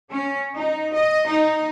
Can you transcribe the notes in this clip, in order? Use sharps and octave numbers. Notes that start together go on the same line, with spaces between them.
C#4
D#4
D#5
D#4